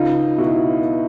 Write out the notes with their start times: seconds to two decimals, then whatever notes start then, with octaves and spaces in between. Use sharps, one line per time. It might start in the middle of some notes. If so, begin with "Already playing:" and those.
Already playing: C#2 D#4 F4
0.38 B2 E4 F#4